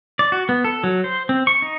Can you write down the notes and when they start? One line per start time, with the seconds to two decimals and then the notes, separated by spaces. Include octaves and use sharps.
0.19 D5
0.32 F#4
0.49 B3
0.64 A4
0.84 F#3
1.04 C5
1.29 C4
1.47 C#6
1.62 D#4